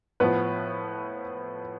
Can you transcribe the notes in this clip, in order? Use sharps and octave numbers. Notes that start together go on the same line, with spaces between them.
A2 F3 B3 B4